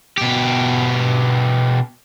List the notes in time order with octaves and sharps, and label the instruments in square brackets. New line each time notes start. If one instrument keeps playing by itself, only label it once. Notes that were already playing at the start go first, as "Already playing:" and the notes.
[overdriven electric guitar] B2 G4